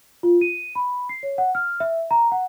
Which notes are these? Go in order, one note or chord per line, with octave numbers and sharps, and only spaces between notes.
F4
D#7
B5
C7
C#5
F#5
F6
E5
A#5
F#5